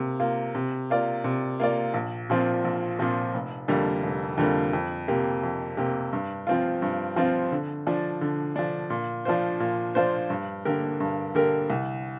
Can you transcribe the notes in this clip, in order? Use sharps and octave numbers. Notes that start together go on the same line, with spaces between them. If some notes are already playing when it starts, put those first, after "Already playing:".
Already playing: C3 A#3
A#3 F4
C3
A#3 F4 D5
C3
A#3 F4 D5
A#1
A#2 F3 C4
A#1
A#2 F3 C4
F1
F2 D3 G3 A#3
F1
F2 D3 G3 A#3
F2
C3 A#3 G4
F2
C3 A#3 G4
G2
F3 C4 F4
G2
F3 C4 F4
D3
F3 D4
D3
F3 D4
A#2
F3 D4 F4 C5
A#2
F3 D4 F4 C5
G2
D3 A#3 G4 A#4
G2
D3 A#3 G4 A#4
C2